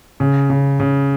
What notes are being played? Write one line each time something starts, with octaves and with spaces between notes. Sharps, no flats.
C#3
C#3
C#3